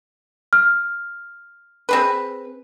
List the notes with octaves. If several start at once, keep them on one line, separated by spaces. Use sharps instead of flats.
F6
C4 G#4 B4